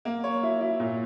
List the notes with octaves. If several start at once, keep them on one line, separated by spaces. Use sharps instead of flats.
A#3
C#5
E4
E4
A#2